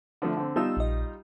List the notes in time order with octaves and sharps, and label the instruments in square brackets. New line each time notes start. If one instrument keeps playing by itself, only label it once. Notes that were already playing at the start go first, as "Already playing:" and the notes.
[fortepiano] D3 F3 A3
D3 C4
[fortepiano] G3 D#4 F4 [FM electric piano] B3 A5 E6
[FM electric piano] A#1 D#5